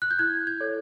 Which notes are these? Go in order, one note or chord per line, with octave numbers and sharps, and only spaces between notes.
F#6
G6
E4 G#6
G#6
A4 C#5